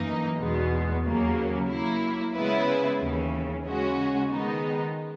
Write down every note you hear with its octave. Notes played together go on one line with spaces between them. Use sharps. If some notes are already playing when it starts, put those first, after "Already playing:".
Already playing: F#2 E3 A#3 D#4
E2 B2 G#3 B3
D#2 C#3 F#3 A#3
F#3 A#3 E4
C#3 G#3 B3 E4 B4
D#2 C#3 E3
C#3 G#3 C#4 F#4
D#3 G#3 B3 D#4